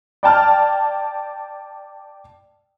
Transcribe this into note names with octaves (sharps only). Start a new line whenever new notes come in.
D5 G5 A5 F6